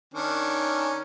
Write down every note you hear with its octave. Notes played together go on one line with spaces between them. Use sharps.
D#3 C#4 D4